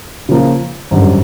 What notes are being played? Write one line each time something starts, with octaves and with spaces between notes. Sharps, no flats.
C#3 F3 A#3
G#1 F#2 D3 G3